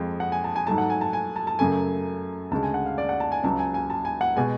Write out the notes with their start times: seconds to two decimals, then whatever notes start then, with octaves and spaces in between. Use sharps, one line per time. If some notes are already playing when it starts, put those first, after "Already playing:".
Already playing: F2 F3 G#3
0.20 F#5
0.32 G#5
0.44 A5
0.56 G#5
0.67 G#2 F#3 A3 A5
0.78 F#5
0.90 G#5
1.01 A5
1.13 G#5
1.36 A5
1.47 A5
1.59 F#2 C#3 F#3 A3 G#5
2.51 D2 C#3 G#3 A5
2.63 G#5
2.74 F#5
2.86 F5
2.98 D5
3.09 F#5
3.20 A5
3.32 G#5
3.43 C#2 C#3 F#3 A5
3.59 G#5
3.74 G#5
3.90 A5
4.05 G#5
4.21 F#5
4.36 B2 G#3 G#5